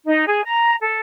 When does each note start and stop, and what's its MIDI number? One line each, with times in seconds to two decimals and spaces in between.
0.05 0.24 63
0.27 0.41 68
0.45 0.75 82
0.80 1.00 69